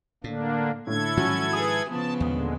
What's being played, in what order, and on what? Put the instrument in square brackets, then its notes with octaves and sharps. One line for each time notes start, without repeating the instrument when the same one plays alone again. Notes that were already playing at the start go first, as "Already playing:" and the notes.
[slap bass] A2 [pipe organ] D3 A#3 D4
[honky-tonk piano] A2 D3 [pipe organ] E4 A4 G#6
[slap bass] G#2 D#3 F3 [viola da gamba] F#3 C#4 [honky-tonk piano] F#4
[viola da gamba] G#4 B4 [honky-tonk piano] D#6
[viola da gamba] C#3 F3 B3 [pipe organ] A5
[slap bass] D#2 [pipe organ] A#2 D3 G#3